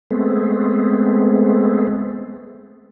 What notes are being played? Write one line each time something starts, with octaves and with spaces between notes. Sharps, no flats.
G#3 A3 B3 C4